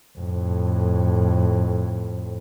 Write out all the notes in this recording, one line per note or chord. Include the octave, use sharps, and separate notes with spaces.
F2 A2